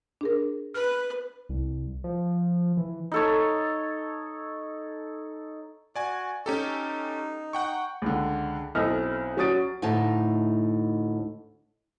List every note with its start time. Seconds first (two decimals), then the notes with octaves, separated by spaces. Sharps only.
0.21 D4 G#4 A#4
0.74 B4 F6
1.49 C2
2.04 F3
2.77 E3
3.12 D#4 A4 C#5
5.96 F#4 D5 G#5
6.46 C#4 D#4 G4 A4
7.53 F#5 G5 C#6
8.02 C#2 D3
8.75 B1 C4 E4 A4 D#5 F6
9.37 F#3 C#4 F#4 D#6 A6 D7
9.82 D2 A2 D#4 E4 A5